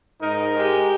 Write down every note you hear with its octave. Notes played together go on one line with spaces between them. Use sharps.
G#2 D#4 A#4
G#3 G4